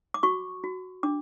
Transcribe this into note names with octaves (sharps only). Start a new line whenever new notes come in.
D6
F#4 C#6
F#4
D4 D6